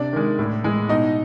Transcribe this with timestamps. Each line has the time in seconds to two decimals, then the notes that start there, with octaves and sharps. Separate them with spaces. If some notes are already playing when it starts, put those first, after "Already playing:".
Already playing: C3 D4 D5
0.13 D#3 G#3
0.39 A2
0.64 E3 G#3
0.89 B2 D#4 D#5